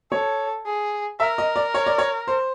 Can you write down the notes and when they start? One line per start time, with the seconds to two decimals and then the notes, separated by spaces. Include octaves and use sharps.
0.12 A4 C#5
0.66 G#4
1.20 A#4 E5
1.38 D#5
1.56 D5
1.74 C#5
1.86 D5
1.98 C#5
2.27 C5